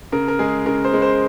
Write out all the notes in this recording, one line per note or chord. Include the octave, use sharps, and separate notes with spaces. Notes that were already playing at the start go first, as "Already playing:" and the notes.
C#3 A#4
A#4
G#3 G#4
C#3 A#4
C5
G#3
C5